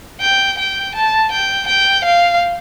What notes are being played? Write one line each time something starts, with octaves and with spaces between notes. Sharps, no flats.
G5
G5
A5
G5
G5
F5